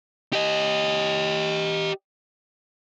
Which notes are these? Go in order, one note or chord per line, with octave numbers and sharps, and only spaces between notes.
G4 D#5